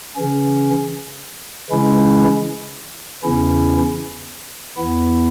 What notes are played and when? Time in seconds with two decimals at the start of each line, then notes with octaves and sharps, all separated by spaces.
0.16 C#3 E3 C#4
1.70 C#3 E3 G#3 C#4 E4
3.24 E2 C#3 E3 C#4 E4
4.77 E2 E3 B3 E4